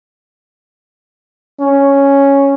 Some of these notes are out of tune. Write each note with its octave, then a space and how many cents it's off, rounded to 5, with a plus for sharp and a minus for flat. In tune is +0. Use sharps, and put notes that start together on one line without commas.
C#4 +0